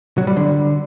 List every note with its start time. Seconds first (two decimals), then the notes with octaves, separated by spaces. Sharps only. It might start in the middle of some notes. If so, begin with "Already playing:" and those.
0.18 F#3
0.27 G3
0.37 D3